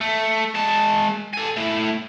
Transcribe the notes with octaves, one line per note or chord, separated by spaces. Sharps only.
A3
G#3 A5
A4 G#5
A3 E4